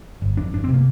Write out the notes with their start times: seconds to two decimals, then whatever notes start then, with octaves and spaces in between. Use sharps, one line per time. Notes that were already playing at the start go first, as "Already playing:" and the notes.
0.22 G1
0.37 F2 D4
0.53 G1 D4
0.64 C4
0.69 C3
0.74 A#3